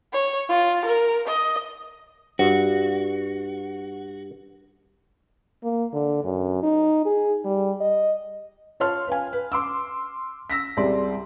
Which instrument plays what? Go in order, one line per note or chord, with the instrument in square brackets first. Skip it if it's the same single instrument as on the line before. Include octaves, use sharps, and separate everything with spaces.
[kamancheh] C#5
F4
A#4
D#5
[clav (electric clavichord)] G2 [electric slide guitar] F#4
[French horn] A#3
D3
F#2
D#4
G#4
G3
D#5
[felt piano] F4 C#5 A5 C6 F6
B4 F5 G#5
B4
C6 D6 E6
E6 A#6 B6
C2 G4 G#4 D5 C6